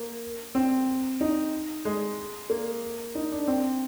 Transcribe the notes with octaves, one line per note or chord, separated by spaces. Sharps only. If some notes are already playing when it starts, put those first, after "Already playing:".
Already playing: A#3
C4
D#4
G#3
A#3
D#4
D4
C4